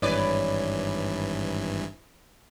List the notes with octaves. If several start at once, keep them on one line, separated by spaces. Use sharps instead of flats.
G#1 G2 E3 B4 C#5 D5